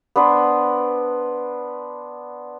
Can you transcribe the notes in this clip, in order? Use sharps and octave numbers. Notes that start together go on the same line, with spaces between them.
B3 D4 B4 C5